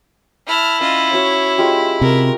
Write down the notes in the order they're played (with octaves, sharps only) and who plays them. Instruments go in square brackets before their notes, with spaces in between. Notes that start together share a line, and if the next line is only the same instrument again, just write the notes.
[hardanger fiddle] E4 [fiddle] A5 F6
[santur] C#4 [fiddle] F4 D#5
[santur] C#4 F#4 C#6 [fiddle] C#5
[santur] G#3 F4 G4
[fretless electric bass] C3 [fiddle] A#4 [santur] C#6